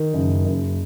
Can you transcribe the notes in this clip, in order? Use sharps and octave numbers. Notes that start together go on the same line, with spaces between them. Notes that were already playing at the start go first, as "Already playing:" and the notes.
Already playing: D#3
F#1
F#1